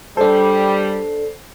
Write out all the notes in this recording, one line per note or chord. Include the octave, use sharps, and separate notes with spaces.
G3 D4 A4 C5